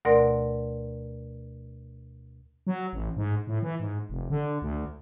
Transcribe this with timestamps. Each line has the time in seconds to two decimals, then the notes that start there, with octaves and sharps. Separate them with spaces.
0.05 D2 B2 A3 A#4 D5 C6
2.67 F#3
2.93 A1
3.17 G#2
3.47 A2
3.62 E3
3.80 G#2
4.09 F1
4.30 D3
4.62 D2